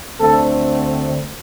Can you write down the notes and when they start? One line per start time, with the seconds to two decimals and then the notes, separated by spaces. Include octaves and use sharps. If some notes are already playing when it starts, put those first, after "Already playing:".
0.20 D2 D3 A3 C4 A4